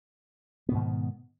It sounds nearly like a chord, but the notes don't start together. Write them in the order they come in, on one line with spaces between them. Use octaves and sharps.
B3 B2 G#2 D#3